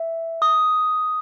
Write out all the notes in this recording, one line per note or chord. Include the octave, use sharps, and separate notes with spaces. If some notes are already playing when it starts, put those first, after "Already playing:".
Already playing: E5
D#6